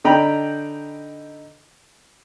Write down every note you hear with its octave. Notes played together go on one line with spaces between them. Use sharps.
D3 D#4 G5 A#5 B5